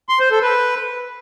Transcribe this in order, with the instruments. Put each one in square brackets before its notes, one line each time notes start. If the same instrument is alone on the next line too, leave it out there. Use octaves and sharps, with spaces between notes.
[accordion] C6
C5
A4
B4